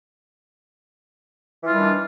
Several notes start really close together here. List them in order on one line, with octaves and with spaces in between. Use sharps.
E3 F4 G3 D#3 D4